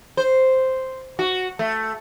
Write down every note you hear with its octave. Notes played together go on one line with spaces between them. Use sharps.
C5
F#4
A3